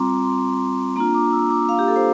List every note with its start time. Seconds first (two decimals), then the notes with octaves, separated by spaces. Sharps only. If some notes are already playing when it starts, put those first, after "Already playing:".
Already playing: G3 C4 F4 A#5 C6 D6
0.23 C6
0.96 A#3 D4 F4 A#5
1.14 D6
1.32 E6
1.50 D6
1.69 F5
1.79 G4
1.88 A4
1.96 C5